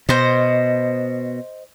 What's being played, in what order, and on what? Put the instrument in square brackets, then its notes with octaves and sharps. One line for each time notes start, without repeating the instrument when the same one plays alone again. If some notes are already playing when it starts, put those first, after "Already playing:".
[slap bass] B2 [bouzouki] C5 D#5